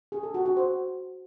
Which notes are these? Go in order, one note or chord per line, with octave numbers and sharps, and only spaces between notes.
G#4
A4
F#4
F#4
C5